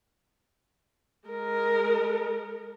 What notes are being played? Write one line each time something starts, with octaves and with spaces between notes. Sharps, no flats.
G#3 A#4